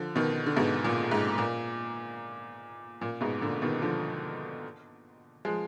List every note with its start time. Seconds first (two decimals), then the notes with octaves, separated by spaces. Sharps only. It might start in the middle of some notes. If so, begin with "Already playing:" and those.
Already playing: D3 F3
0.15 B2 D#3
0.46 D3
0.56 G#2 B2
0.84 A#2
1.11 G#2
1.38 A#2
3.01 A#2
3.21 G#2 B2
3.41 A#2 D3
3.62 B2 D#3
3.82 D3 F3
5.45 F3 G#3